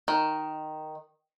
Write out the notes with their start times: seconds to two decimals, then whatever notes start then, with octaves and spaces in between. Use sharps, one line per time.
0.08 D#3